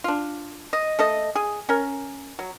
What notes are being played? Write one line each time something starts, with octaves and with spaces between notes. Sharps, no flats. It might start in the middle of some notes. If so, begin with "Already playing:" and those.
D4 F4
D#5
A3 A4 D#5
G#4
C#4 A#4
F#3